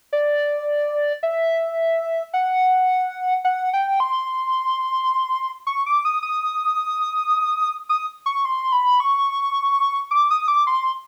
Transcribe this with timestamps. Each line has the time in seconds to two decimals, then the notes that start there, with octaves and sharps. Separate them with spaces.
0.13 D5
1.23 E5
2.33 F#5
3.45 F#5
3.73 G5
4.00 C6
5.67 C#6
5.86 D6
6.05 D#6
6.22 D#6
7.89 D#6
8.26 C#6
8.45 C6
8.72 B5
9.00 C#6
10.11 D6
10.31 D#6
10.48 D6
10.67 C6